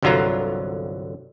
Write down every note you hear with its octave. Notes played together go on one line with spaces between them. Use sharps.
G1 C2 D3 F#3 F4 A#5